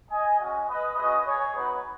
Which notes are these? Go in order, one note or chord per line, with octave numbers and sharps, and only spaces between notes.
D#5 G#5
G#3 C#4 F#4 D#5 G#5
B4 D#5
G#3 C#4 F#4 B4 D#5
G#4 C#5
B3 D#4 F#4 B4